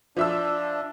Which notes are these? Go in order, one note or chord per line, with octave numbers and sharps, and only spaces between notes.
F3 D4 E5 E6